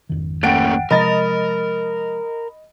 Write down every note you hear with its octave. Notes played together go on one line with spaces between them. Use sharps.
G#1 F2 D#3
A3 A#3 C#4 F#5 G5 F#6 A6 D7
C3 F3 G#3 A#4 D#5 B5 A6